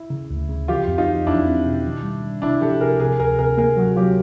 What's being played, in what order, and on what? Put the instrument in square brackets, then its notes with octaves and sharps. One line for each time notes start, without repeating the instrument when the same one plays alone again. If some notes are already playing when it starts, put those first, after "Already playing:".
Already playing: [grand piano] E4
[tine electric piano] C#3
D2
C#3
[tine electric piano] F3 [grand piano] F4 G4
[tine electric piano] F2
[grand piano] D#4 F4
[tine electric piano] F3
[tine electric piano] E2 [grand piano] D4 E4
[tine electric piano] C4
B2
D#3
G3
G3
[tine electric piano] C3 [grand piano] D4 E4
[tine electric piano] F3 [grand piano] G4 A4
[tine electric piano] C3 [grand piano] G#4 A#4
[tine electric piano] C3 [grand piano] G#4 A#4
[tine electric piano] D2 [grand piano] G#4 A#4
[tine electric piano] C3 [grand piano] G#4 A#4
[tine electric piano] A#3 [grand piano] G#4 A#4
[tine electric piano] F#3 [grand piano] F#4 G#4
[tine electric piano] F#3 [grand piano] F4 G4